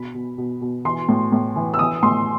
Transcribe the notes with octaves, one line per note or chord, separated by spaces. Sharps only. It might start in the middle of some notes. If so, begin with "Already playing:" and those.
Already playing: B2 B5
B2
B2
B2
E3 C6
A2
A2
E3
E6
E3 D#6
A2 C6